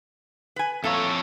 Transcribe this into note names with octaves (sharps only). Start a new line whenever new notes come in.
B4 G#5
F2 A3 A#3 A4 C#5